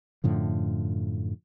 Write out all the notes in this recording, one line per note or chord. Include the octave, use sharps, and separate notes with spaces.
F#2 A2 D3 F3